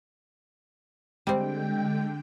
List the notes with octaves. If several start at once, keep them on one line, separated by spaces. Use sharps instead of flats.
D3 G3 G#3 C4 G5